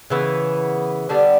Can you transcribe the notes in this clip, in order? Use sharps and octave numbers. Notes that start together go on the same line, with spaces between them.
C#3 E3 B3
D3 G3 B3 D4